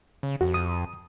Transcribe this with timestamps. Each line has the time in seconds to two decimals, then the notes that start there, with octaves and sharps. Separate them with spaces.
0.23 C#3
0.41 F2 F#4
0.54 D#6